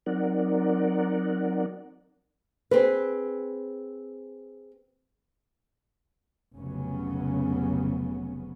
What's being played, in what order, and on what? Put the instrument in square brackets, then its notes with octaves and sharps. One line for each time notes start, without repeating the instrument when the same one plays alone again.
[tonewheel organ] F#3 C4 D#4 A#4 D5 F#5
[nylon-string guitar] C4 G#4 B4
[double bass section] F1 A#1 C#3 F#3 B3 C#4